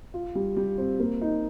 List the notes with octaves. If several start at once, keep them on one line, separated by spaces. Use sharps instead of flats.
F4
G3
G3
C4
A#3
D#4